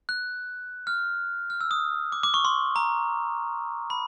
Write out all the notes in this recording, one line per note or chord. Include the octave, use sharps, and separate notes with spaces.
F#6
F6
F6
E6
D#6
D6
D6
C#6
C6
A#5
B5